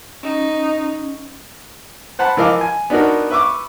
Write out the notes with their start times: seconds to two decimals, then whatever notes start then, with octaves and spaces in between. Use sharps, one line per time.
0.23 C#4 D#4
2.19 C5 F#5 A5 B5
2.37 E3 F3 A#4 D#5 F5 D6
2.61 G#5
2.90 B3 D4 D#4 F#4 A#4
3.30 B4 E5 C#6 D6 E6